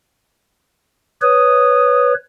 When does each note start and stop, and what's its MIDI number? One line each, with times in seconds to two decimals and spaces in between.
1.22 2.14 71
1.22 2.14 73
1.22 2.12 87